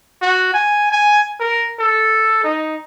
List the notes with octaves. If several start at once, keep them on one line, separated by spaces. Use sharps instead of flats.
F#4
G#5
G#5
A#4
A4
D#4